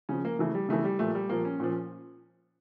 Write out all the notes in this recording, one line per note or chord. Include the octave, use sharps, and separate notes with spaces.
C#3 F3 C#4
A#3
C#3 E3 A3
G3
C#3 E3 A3
G3
A#2 F3 A3
G3
A#2 F3 A#3
C#4
A#2 F3